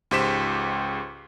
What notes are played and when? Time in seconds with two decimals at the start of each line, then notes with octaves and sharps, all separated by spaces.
0.11 C#2 G#2 G4 C5 B6 E7